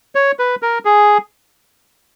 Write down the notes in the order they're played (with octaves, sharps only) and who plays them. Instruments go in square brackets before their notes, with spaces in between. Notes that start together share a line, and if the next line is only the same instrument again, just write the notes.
[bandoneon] C#5
B4
A#4
G#4